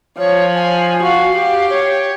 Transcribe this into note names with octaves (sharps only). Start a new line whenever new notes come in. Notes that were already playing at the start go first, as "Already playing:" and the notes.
F3 C#5
G#5
F#4 F5
G4
C#5